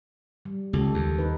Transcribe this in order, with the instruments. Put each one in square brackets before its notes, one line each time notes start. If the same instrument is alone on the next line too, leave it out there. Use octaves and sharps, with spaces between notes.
[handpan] G3
[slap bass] C#2 [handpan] G4 A4
[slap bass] D#2
[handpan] D#4 B4